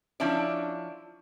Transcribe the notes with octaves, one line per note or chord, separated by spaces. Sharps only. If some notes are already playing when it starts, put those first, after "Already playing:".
F3 C#4 D4 E4 D5